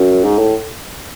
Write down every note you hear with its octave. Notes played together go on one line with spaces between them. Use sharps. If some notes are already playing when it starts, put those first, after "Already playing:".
Already playing: F#2
G#2
A2